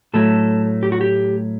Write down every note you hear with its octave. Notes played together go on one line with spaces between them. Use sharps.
A2 F#3 A3 A4
G4
F#4
G4